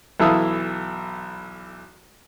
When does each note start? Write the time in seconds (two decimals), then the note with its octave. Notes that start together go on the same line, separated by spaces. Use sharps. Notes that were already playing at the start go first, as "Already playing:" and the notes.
0.20 B1 E3 A4 E5 F5 D#6